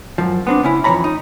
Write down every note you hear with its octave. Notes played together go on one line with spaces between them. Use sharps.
F#2 F3
B3 C4 D4
C#3 C#4 E4
F2 E3 F3 C#5 A#5 B5
D#4